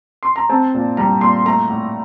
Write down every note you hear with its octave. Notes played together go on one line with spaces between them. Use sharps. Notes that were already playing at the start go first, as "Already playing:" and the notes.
C6
A#5
C4 A5
A#2
G3 A#5
A#2 C6
A3 A#5
A2